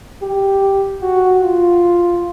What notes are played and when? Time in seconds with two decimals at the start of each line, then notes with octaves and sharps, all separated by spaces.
0.22 G4
1.02 F#4
1.42 F4